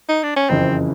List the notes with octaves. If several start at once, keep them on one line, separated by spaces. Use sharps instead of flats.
D#4
D4
C#4
F#1 F2 C#3 E3 C4